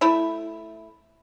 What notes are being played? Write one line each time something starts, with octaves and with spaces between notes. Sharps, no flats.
A3 E4 E5